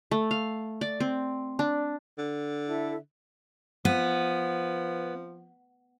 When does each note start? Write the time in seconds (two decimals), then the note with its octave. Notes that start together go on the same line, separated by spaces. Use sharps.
0.11 A3
0.31 F5
0.81 D5
1.00 C4
1.59 D4
2.18 D3
2.67 E4 A4 E5
3.85 F3 B3